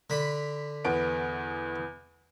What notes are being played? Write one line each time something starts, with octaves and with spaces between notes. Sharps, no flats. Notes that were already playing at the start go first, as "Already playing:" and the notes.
D3 B5
E2 B3 D7